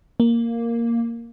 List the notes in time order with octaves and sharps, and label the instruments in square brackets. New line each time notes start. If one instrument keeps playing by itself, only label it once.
[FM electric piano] A#3